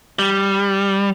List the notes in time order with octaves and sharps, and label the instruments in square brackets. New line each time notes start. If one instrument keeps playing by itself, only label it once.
[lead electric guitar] G3